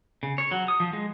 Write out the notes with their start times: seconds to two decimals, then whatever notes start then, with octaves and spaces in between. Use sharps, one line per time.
0.23 C#3
0.38 C#5
0.52 F#3
0.68 D#6
0.80 F3
0.93 G#3